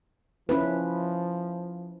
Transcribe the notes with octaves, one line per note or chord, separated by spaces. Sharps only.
F3 C#4 E4 B4